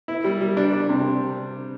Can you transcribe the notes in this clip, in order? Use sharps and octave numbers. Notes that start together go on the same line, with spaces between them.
E4
G3
G3
D4
D4
C3